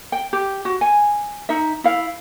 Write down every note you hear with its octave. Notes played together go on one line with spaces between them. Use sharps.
G5
G4
F#4
G#5
D#4 E5
E4 F5